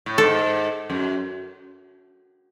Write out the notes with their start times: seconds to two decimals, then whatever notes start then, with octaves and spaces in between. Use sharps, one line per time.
0.06 A2
0.18 G#2 A4
0.90 F#2